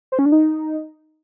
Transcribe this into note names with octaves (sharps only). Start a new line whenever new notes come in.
C5
C#4
D4
D#4